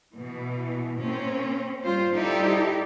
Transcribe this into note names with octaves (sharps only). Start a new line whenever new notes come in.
B2 E3
A#3 C4 C#4
G3 F4 C5
G3 D#4 E4 G4 A4 D5